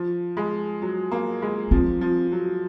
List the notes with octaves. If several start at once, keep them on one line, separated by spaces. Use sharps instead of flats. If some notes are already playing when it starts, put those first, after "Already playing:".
Already playing: F3
G#3
F#3
A#3
G#3
F3 C4
F3
F#3